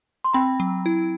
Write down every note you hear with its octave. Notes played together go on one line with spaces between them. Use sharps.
C6
C4 G5 B5
F#3
E4